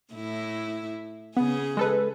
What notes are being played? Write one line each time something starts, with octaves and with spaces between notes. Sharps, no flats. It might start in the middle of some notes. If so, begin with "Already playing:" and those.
A2 E4
C#3 B3 G#4
G#3 A4 B4